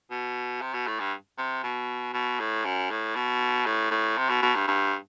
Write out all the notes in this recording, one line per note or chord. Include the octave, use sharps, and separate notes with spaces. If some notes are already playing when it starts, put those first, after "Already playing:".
B2
C3
B2
A2
G2
C3
B2
B2
A2
F#2
A2
B2
A2
A2
C3
B2
B2
G2
G2